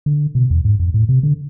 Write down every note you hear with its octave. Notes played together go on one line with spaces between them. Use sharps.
D3
B2
E2
G#2
F2
A2
C3
D3